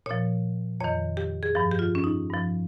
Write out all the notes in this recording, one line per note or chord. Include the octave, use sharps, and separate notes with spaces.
A#2 F3 C#5
F2 D#3 C#5
G4
G#4
G2 F3 G4
G4
F4
C#4
D#4
G2 F3